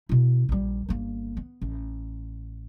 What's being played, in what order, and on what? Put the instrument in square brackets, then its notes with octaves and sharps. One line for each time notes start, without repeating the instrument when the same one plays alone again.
[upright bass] B2 E4
A#1 G3
G1 A#3
B3
A1